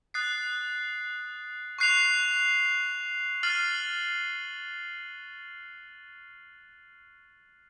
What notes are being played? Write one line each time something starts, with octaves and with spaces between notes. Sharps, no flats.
D#6 F#6 A6 C7
C#6 F#6 C7 F7
F6 A6 C7 D#7 F#7